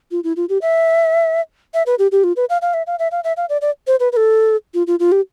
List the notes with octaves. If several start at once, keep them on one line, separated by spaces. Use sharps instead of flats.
F4
E4
F4
G4
E5
E5
B4
G4
G4
F4
B4
F5
F5
E5
F5
E5
F5
E5
F5
D5
D5
C5
B4
B4
A4
F4
F4
F4
G4